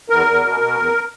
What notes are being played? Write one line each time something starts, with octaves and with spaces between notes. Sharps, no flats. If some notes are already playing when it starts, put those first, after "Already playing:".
E2 A#4
E2
B2
B2
E2